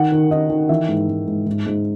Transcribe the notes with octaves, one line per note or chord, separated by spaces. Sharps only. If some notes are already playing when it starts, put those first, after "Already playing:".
Already playing: D#3 F#5
D#3
D#3 D#5
D#3
E3 E5
G#2
G#2
G#2
G#2
G#2